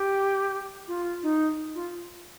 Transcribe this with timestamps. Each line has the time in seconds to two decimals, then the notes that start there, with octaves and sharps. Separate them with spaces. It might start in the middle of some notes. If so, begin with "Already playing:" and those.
Already playing: G4
0.88 F4
1.23 D#4
1.75 F4